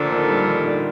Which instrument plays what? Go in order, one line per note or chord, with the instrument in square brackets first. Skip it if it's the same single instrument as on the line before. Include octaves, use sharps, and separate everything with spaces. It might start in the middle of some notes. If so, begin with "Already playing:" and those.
Already playing: [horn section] A#2 F3 A3 D4 A4 [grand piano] D3
[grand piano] D#3
G3
D#3
D3